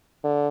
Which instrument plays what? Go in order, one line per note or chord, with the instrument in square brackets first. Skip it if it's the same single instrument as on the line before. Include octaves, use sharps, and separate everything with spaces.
[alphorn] D3